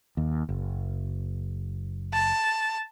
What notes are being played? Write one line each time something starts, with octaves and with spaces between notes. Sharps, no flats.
D#2
F#1
A5